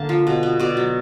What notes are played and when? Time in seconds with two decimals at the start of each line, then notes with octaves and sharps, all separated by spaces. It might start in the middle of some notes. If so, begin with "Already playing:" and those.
Already playing: D3 A#3 A5
0.09 F3
0.27 B2
0.43 B3
0.59 B2 D5
0.77 F#3